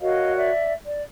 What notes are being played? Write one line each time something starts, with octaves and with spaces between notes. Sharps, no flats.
F#4 A#4 C#5 D#5 F5
D5 E5
D5